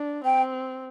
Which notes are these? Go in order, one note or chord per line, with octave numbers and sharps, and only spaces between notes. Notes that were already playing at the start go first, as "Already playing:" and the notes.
Already playing: D4
C4 G5